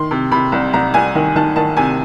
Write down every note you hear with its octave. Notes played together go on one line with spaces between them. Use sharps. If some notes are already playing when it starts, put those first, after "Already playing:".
Already playing: D#3 C6
C3
C3 B5
C2
C2 A#5
C2 G#5
D#3
D#3 A5
D#3 A5
C3 G#5